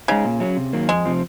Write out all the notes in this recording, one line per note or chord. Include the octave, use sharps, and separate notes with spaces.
C#3 G#3 D#4
A#2
F#3 C#4
C3
D#3 F#3 A#3
F2 G#3
C3 F3 C4